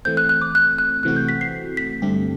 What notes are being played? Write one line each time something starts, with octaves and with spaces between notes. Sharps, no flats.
E3 A3 C4 G6
F#6
F#6
D6
F#6
F#6
C3 E3 A3 C4 F#4 F#6
G6
B6
C7
B6
G2 D3 A3 C4 G4